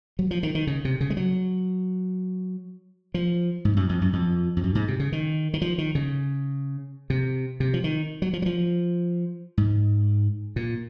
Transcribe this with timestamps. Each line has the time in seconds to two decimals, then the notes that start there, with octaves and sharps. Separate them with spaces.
0.19 F#3
0.31 F3
0.43 D#3
0.55 D#3
0.67 C#3
0.85 C3
1.01 C#3
1.10 G#3
1.17 F#3
3.14 F3
3.65 G#2
3.77 F#2
3.89 F2
4.01 F#2
4.13 F2
4.57 F2
4.64 F#2
4.75 G#2
4.88 C3
5.00 C#3
5.12 D#3
5.54 D#3
5.62 F3
5.78 D#3
5.95 C#3
7.10 C3
7.60 C3
7.74 F3
7.84 D#3
8.22 F#3
8.33 F3
8.42 F#3
8.46 F3
9.58 G#2
10.56 A#2